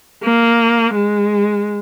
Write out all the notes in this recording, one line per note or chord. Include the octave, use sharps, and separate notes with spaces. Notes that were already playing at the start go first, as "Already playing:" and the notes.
A#3
G#3